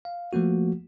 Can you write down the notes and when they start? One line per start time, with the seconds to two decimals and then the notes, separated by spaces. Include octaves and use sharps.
0.05 F5
0.33 F3 A3 A#3 F#4